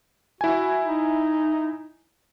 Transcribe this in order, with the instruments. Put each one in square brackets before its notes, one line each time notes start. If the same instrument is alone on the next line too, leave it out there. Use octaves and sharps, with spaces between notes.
[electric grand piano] E4 G#5 [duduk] F#4
[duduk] D#4